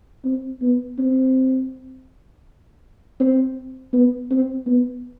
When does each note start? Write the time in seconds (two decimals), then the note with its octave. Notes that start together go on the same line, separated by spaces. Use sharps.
0.24 C4
0.61 B3
0.98 C4
3.20 C4
3.93 B3
4.31 C4
4.67 B3